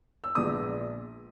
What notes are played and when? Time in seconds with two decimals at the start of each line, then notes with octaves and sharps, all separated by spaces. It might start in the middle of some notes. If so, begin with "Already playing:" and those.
0.24 E6
0.35 A#1 A#2 G#3 B3 D#6